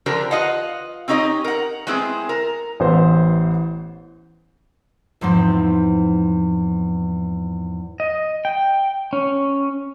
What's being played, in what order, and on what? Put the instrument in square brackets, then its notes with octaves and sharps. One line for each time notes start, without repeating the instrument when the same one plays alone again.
[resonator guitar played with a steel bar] D3 F3 D4 G4 A#4 C5
F4 B4 D#5 F5 F#5
C4 C#4 D#4 G4 D#5
A#4 F#5
G#3 B3 C4 E4 G#4
A#4
[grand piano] A1 E3 B3 C5 F#5
[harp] E2 G#2 F3 C4
[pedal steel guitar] D#5
G5
C#4